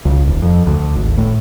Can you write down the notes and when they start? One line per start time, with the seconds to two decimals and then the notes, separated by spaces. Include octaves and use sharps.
0.05 C#2
0.27 D#1
0.42 F2
0.67 D2
0.95 G#1
1.17 A2